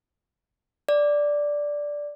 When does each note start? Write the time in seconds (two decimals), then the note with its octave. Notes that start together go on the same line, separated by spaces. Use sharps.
0.89 D5